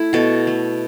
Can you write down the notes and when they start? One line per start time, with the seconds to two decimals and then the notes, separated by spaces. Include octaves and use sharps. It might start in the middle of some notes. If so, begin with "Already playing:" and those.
Already playing: A3 E4
0.13 B2 F#4 A4
0.47 A3